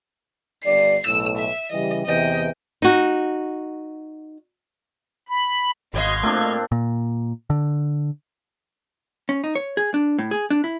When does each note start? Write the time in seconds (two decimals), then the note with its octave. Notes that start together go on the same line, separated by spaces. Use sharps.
0.64 G1 G2 D5 C7
1.07 B1 A2 E6
1.37 E5
1.72 C#3 E3 G3 D#5
2.06 E2 C3 E3 D#5 G5
2.82 D#4 F#4
5.29 B5
5.94 G#1 B2 D5 D#5 F5 C6 G#6
6.23 A#2 A3 C4 D4
6.72 A#2
7.50 D3
9.29 C#4
9.44 D#4
9.55 C#5
9.77 G#4
9.94 D4
10.19 A2
10.31 G#4
10.50 D4
10.64 E4